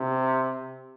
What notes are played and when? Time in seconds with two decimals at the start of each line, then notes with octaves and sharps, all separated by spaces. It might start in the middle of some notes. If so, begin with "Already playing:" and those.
Already playing: C3